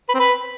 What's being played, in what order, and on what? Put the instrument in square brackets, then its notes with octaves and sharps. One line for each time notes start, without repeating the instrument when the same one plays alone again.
[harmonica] B4
C4
B4